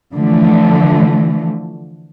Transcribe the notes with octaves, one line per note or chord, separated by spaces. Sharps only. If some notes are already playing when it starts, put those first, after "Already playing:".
D3 E3 F3 A3